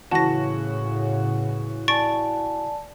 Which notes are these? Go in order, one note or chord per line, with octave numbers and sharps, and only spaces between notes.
A2 C#3 E3 F#4 A5 A#6
D5 G#5 A5 C#6 A6 D7